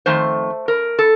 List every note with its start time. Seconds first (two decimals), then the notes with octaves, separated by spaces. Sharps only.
0.06 F2 D#3 A3 C5
0.68 A#4
0.99 A4